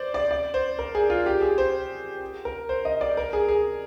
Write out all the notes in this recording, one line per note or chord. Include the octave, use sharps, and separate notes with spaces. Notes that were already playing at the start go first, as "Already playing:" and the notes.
Already playing: C5 D5
D5
D5
C5
A#4
G#4
F4
G4
G#4
C5
A#4
C5
D#5
D5
A#4
G#4
G#4